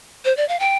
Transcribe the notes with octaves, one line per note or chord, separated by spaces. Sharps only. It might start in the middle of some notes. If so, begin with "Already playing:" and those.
C5
D5
F5
G5